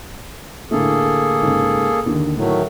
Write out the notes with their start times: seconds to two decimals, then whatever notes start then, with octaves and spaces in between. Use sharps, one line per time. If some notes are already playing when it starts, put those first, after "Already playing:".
0.71 A2 D3 A3 A#3 G#4 A4
1.42 G#2 C#3
2.06 D#2 D3 D#3
2.37 A2 D#3 F#3 A3